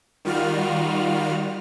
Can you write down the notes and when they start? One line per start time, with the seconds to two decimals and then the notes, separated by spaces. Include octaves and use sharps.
0.25 D#3 G3 F4 F#4 F6